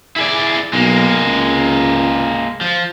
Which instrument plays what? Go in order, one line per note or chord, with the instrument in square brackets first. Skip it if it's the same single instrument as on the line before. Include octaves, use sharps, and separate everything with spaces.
[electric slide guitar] E4 G#4 D5
[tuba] B1 [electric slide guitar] G#3 A#3
[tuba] C#2
[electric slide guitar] F3